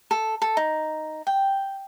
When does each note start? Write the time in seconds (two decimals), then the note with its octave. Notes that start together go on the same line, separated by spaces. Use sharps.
0.11 A4
0.42 A4
0.57 D#4
1.27 G5